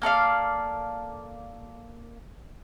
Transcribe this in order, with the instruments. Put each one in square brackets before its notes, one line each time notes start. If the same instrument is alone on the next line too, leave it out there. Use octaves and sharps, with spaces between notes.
[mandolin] A#3 A4 D5 F5